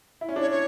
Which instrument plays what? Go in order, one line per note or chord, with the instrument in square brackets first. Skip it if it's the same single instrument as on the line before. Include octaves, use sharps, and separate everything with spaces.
[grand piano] E4
C#4
[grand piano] D4 [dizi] C#5
[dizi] C#5